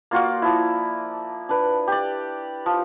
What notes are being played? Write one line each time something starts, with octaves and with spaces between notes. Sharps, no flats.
A#3 F4 F#4 D5
F3 E4
D4 B4
G4 D5
F3